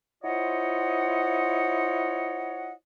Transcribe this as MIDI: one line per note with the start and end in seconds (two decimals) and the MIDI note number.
0.23 2.72 64
0.23 2.72 65
0.23 2.72 72
0.23 2.72 73
0.23 2.72 75
0.23 2.72 78